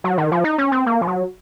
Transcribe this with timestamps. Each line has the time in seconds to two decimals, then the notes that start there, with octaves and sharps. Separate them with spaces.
0.04 F#3
0.18 D#3
0.32 F3
0.44 D#4
0.58 C#4
0.72 C4
0.86 A#3
1.01 F3
1.07 F#3